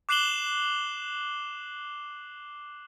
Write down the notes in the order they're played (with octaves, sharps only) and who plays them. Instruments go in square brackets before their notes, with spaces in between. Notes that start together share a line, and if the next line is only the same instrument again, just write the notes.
[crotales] D6 F#6 C7 E7 F#7 G7